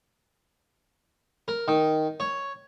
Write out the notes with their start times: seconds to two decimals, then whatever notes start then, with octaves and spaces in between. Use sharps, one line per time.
1.48 A#4
1.68 D#3
2.20 C#5